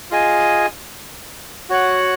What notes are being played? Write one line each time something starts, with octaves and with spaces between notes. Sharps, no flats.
F4 G#4 D#5 G#5
F#4 C#5 F#5